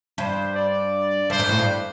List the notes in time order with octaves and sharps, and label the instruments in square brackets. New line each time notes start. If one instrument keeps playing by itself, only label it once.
[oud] G2 [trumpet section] C5
[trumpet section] D5
[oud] G2 [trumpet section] C5
[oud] G#2
A2
G2